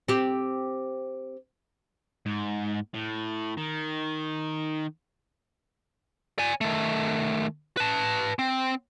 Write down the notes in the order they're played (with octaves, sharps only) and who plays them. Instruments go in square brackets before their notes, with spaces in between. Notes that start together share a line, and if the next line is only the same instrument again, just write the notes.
[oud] C4 G4
[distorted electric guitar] G#2
A2
D#3
D5 G#5
D#3 A3
B4 A5
C4